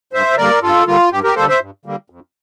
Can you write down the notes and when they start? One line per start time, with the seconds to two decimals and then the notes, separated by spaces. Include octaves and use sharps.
0.13 G2 C5 E5
0.37 D3 G3 A#3 A#4 D5
0.62 G2 F4 A4
0.86 D3 G3 A#3 F4
1.11 G2 G4
1.24 G4 A#4
1.35 D3 G3 A#3 A4 C5
1.49 C5 E5
1.61 G2
1.85 D3 G3 A#3
2.10 F2